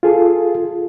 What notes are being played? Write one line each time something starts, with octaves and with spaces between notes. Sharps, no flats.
F4 G#4 A4